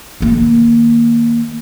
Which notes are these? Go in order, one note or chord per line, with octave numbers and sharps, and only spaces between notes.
D#3 A#3